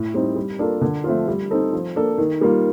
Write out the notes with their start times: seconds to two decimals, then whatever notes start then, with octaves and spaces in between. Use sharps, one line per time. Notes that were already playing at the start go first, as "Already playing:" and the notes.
Already playing: A2
0.14 G3 C4 D#4
0.36 G3
0.59 A#3 D4 F4 A4
0.81 D3
1.04 F3 A3 C4 F4
1.28 G3
1.51 C4 D#4 A4
1.73 F3
1.96 A#3 D4 A4
2.18 D#3
2.41 G3 A#3 F4